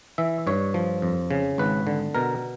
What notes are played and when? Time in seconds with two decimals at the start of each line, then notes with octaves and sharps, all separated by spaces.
0.18 E3 E5
0.47 G2 C#5
0.74 F3
1.02 F2
1.31 C#3
1.58 G#1 B4
1.87 D3
2.15 B2 A#4